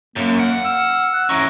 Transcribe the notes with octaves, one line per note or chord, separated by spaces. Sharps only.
F#2 A#3
F#5
F5 E6
F#5
E3 C#4 A#5